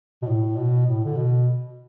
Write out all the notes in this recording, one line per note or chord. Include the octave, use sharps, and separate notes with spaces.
B2
A2
B2
A2
D3
B2